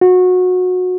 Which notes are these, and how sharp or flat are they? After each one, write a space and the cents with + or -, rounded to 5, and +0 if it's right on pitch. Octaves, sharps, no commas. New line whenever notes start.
F#4 -20